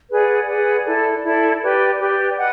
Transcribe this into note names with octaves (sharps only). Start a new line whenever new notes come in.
G#4 B4 D5 F#5
G#4 B4 D5 F#5
E4 A4 D5
E4 A4 D5
G4 B4 D5
G4 B4 D5
B4 D#5 F#5